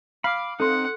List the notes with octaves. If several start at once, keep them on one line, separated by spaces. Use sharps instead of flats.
F5 B5 D6
C4 D#4 A4 F#5 C6